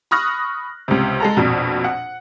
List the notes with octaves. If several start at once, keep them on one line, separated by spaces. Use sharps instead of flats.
B5 C#6 D#6 F6 F#6 A#6
C#2 C3
G#3 A4 A#5
A#1 F2 B2
F#5